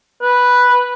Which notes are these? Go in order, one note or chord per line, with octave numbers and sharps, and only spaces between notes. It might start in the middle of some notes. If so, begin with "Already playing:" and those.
B4